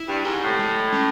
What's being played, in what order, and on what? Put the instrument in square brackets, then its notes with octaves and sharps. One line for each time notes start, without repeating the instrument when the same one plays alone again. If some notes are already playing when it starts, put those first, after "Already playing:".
Already playing: [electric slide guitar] E4
[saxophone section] G2
[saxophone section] G#2 [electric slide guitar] G4
[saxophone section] A2
[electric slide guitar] G#3
C#4